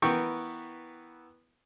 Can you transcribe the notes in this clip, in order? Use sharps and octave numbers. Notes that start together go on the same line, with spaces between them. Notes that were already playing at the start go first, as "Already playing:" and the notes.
E3 B3 A#4 G5 C#6